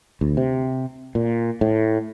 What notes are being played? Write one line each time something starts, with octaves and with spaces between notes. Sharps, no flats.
D2
C3
A#2
A2